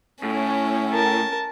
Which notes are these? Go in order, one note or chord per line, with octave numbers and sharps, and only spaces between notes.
A2 C#4
A#4 A5